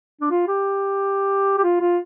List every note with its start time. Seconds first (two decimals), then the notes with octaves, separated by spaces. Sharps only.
0.21 D4
0.31 F4
0.48 G4
1.58 G4
1.63 F4
1.81 F4